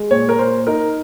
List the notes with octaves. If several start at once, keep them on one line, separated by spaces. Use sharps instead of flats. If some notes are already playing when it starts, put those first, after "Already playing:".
Already playing: G#3
A#2 C#5
A#4
A#2 C5
D#4 A#4